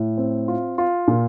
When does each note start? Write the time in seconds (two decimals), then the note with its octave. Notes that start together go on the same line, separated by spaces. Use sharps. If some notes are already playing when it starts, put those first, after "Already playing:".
Already playing: A2
0.17 C4
0.48 F4
0.78 F4
1.08 A#2